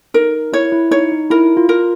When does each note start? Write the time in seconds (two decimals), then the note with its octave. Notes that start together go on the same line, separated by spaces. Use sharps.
0.14 D#4 A#4
0.52 E4 C#5
0.72 E4
0.91 D#4 C#5
1.12 D#4
1.30 E4 A#4
1.57 F4
1.69 A#4